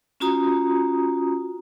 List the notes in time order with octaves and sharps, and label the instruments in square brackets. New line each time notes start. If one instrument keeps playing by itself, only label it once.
[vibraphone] C#4 F4 F#4 A#5 D#6